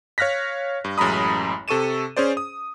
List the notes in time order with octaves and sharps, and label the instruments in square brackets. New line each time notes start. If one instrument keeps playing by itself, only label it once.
[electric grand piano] C#5 F5 F6 F#6 A#6 B6
G2
A1 F#2 G#3 A#5 B5 D#6
C3 A4 C#6 D#7 E7
C#4 G#4 C5 D5
D#6